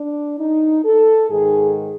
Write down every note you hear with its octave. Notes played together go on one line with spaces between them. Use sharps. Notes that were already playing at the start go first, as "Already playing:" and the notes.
Already playing: D4
D#4
A4
G#2 D#3 G#4